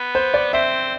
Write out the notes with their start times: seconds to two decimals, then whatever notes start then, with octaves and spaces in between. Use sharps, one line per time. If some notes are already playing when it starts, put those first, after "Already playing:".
Already playing: B3
0.15 C5
0.34 D5
0.53 C4 E5